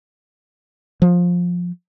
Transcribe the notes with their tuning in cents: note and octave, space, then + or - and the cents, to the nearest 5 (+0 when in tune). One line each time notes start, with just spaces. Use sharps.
F3 +15